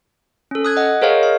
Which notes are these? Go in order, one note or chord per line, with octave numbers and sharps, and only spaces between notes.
C#4 A4
D#6 F#6 G#6
D#5 F#5
G#4 A#4 C5 C#5 D#5 F5
F5